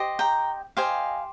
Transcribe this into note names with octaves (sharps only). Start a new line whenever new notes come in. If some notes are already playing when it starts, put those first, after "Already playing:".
Already playing: G4 C5 D#5
G5 A#5
G4 C5 D#5 F5 G#5